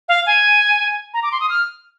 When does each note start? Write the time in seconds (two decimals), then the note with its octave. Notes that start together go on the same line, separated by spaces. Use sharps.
0.08 F5
0.26 G#5
1.14 A#5
1.23 D6
1.32 C6
1.40 D#6
1.49 F6